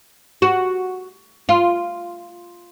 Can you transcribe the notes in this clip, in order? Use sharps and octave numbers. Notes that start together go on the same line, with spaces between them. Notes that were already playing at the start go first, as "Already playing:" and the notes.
F#4
F4